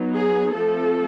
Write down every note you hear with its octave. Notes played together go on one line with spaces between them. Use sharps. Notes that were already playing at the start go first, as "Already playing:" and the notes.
Already playing: F#3 B3 D#4
G#4
F3 A3 C4 A4